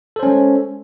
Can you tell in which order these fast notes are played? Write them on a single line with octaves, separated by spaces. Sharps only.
A4 C5 C#4 G#3